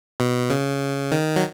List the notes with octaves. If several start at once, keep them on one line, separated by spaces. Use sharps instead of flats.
B2
C#3
D#3
F#3